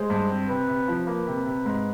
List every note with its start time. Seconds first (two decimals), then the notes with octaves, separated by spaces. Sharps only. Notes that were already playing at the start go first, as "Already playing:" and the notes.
Already playing: G#3 C5
0.10 G2
0.30 C4
0.49 C3 B4
0.68 C3
0.88 F3
1.07 A#3 B4
1.27 C3
1.45 C3
1.65 G#2